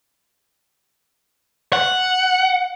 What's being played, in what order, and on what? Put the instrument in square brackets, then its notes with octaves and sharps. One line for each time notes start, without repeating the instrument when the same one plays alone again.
[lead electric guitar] F#5